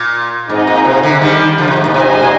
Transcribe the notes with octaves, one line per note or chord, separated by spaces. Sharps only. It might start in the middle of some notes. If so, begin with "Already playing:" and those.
Already playing: A#2
G#2 C4 D#4 G#4 D#5
A#2
C3
D3
D#3 G3
D3 F3
C3
G#2
A#2
C3 D4 G4 C5 D#5 G#5
G#2
A#2